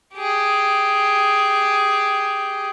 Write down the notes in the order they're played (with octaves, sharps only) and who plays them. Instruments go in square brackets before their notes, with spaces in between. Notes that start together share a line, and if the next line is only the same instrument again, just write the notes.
[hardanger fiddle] G4 G#4